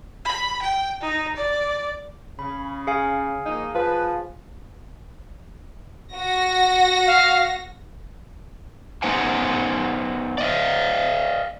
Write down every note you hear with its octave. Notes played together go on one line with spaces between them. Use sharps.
B5
G5
D#4
D5
C#3 B5
G#4 F5 G#5
F3 A#3 D#4
F3 B4
F#4 A#6
F5
B3 D#4 C5 F#5 G#5
D5 D#5 F5